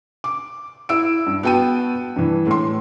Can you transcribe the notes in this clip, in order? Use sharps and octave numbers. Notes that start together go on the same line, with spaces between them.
D6
E4 E6 D7
G2
B3 F#4 G5 A5 D#7
G2 E3
A2 C6